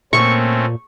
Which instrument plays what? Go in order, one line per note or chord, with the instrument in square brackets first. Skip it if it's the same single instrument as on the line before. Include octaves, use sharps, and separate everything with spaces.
[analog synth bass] A#2 [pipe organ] A3 C4 C#4 [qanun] C#6